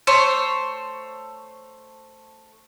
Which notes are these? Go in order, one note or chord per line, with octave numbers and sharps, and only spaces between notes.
A3 C5 C#5